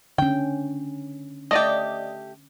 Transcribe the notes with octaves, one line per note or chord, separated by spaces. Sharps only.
D3 C#4 G5
A3 G4 D5 D#5